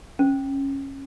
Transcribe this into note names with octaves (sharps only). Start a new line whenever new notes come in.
C#4